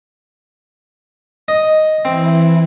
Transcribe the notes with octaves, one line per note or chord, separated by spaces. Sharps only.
D#5
E3 C4 E4